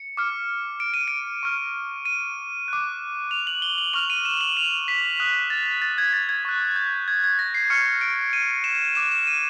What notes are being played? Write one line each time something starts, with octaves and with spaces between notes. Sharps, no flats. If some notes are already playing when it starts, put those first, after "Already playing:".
Already playing: C#7
D6 F6
D7
D#7
D7
C#6 F6
D#7
D6 F#6
F7
F#7
G7
F#7
C#6 F6 F7
D#7
E7
F#7
F7
B6
D#6 F#6
A6
A6
G#6
A6
G#6
C#6 F#6
G6
G#6
G#6
A#6
C7
C#6 F6 C#7
D7
D#7
E7
D6 F#6 E7
E7
D#7